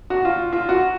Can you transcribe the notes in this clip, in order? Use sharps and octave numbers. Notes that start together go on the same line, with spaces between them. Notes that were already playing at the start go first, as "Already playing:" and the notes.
F#4
F4
F4
F#4